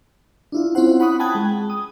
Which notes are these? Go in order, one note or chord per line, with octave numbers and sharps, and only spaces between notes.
D4 E4 F4
C4 C#4 E4 F4 C5 F#5
F#5 B5 C#6 D#6 F#6
G5 A5 B5 D#6 F#6 G#6
G#3
D#6